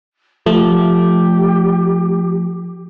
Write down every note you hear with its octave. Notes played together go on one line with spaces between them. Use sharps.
F3 A3 G4